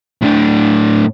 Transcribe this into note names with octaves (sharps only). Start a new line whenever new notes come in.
A2 D4